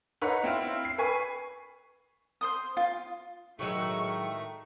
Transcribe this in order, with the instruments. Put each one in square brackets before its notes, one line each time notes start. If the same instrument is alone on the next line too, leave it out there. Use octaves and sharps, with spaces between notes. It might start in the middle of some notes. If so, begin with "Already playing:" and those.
[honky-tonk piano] D#4 B4 C#5 F#5
C4 E4 F4
C7
B4 G#5 C#6
[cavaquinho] C5 C6 D#6
F4
[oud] A2 F#3 G#3 [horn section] D#3 A3 [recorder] C#6